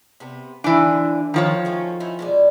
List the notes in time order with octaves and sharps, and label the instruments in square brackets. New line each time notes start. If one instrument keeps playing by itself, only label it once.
[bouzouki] C3 B3
[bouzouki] D3 F3 G#5 [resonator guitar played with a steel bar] E3 D4
[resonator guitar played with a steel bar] D#3 F3 C#5
[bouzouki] A3 C#4 F#4
C#4 D#4 E4
B2 G#3 D5